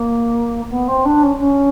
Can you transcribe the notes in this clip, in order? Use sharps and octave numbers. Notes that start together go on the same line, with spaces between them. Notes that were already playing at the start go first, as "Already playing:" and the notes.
Already playing: A#3
B3
C4
D4
C#4
C#4